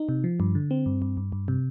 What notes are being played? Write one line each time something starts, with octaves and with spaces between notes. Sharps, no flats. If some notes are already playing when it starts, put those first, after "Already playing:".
Already playing: D#4
C3
F3
G2
D3
C4
G2
G2
G2
G2
C3